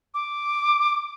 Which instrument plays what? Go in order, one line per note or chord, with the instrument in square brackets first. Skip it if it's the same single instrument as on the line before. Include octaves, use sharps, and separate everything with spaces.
[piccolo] D6